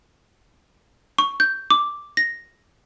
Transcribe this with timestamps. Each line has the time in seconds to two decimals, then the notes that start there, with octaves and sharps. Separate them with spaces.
1.19 C#6
1.40 G6
1.71 D6
2.17 A#6